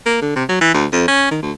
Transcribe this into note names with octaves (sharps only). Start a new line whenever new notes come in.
A#3
D3
C3
F#3
E3
D2
F2
C#4
D#3
D2